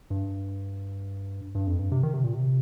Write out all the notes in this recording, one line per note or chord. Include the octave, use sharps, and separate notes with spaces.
G2
G2
F2
G2
C3
D#3
C3
A#2
C3